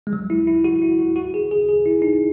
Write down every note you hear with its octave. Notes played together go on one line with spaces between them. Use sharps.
G#3
F#3
E4
E4
F#4
E4
F#4
F#4
G#4
G#4
G#4
E4
D#4